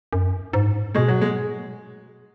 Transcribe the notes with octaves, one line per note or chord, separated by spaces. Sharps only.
F#2
G#2
B2 G#3
F#3
G#3